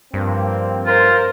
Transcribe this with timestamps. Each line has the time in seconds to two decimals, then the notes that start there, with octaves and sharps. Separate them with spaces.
0.14 G2 F3 A#3 C4
0.86 F4 A#4 C5